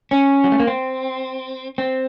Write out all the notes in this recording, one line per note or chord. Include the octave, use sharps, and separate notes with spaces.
C#4
F#3
A3
A#3
C4
C4